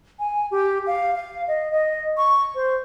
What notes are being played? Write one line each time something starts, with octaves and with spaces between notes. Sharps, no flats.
G#5
G4
F5
F5
D#5
D#5
C#6
C5